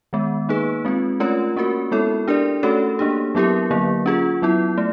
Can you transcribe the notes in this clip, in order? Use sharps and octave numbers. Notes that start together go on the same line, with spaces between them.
D#3 G#3 B3
A#3 D#4 G#4 B4
G#3 C4 F4
A3 C#4 F4 A#4 C#5
A#3 C#4 F#4 A#4
G#3 B3 E4 A4 C#5
D4 G4 A#4 D5
A3 C#4 F#4 A4 C#5
A#3 D4 G4
F#3 B3 E4 G4 A#4
D3 F#3 A#3
C#4 F4 G#4
F#3 B3 E4
A3